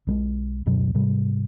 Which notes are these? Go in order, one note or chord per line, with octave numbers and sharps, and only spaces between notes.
B1 G3 G#3
D1 F#2 B2 F#3
G#2 C3 G3